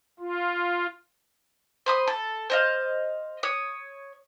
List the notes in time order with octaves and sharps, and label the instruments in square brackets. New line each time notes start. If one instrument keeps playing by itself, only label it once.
[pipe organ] F4
[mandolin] C5 B5 D#6
A4
C5 D#5 F5
C#5 D#6